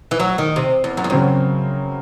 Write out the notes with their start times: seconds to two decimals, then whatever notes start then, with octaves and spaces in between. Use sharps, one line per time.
0.11 E3
0.20 F#3
0.38 D#3
0.56 C3
0.84 E2
0.97 F#2
1.04 E2
1.10 F#2 C#3 F#3 C4